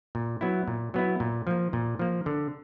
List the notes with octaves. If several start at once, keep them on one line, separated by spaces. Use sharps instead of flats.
A#2
F#3 B3 E4
A#2
F#3 B3 E4
A#2
F3 A#3
A#2
F3 A#3
D3